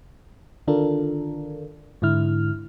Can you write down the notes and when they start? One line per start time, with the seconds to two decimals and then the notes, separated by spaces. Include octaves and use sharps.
0.67 D3 D#3 D4 F4 A4 A#4
2.02 G#2 D3 E4 F6